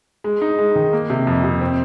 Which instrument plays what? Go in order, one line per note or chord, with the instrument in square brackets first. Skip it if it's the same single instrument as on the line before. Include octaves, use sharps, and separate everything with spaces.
[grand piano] G#3
D#4
G#3
D#3
A#3
C3
F2
C3
C4